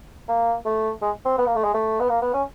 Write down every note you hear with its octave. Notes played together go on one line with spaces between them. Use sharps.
A#3
A3
G#3
C4
B3
A#3
A3
G#3
A3
B3
A#3
B3
C#4